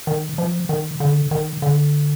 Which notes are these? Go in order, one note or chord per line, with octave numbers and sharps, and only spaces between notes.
D#3
F3
D#3
D3
D#3
D3